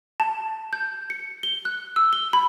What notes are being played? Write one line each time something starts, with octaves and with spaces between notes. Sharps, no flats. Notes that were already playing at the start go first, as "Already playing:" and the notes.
A5
G6
C#7
G7
F#6
E6
G7
B5